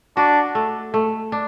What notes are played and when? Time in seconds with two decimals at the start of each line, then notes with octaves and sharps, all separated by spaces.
0.17 D4 F#4
0.55 A3
0.94 A3
1.32 D4